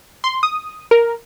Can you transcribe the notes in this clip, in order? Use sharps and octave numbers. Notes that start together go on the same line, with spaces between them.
C6
D#6
A#4